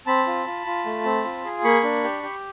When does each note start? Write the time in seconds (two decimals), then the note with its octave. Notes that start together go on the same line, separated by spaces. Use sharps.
0.07 C4 A5 B5
0.27 F4
0.47 F4
0.66 F4
0.86 A3
1.05 C4
1.25 F4
1.45 G#4
1.64 A#3 B5 C#6
1.84 D4
2.04 G4
2.23 G4